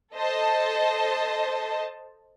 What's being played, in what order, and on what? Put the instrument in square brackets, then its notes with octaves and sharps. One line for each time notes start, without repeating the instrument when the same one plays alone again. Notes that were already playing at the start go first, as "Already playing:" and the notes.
[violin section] A4 C5 D#5 A5